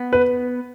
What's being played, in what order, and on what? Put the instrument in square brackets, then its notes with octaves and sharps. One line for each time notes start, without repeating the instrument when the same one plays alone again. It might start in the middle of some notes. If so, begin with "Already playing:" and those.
Already playing: [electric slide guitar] B3
[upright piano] B4